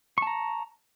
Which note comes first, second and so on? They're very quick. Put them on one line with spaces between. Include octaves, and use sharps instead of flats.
C#6 A5 A#5